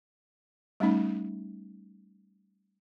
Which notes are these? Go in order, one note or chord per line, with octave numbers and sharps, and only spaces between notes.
G3 A3 C#4 D#4 B5